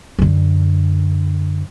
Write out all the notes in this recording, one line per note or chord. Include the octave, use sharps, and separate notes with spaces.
F#2 D3